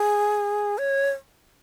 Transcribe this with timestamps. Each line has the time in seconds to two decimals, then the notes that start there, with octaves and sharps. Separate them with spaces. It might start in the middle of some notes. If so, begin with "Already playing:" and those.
Already playing: G#4
0.78 C#5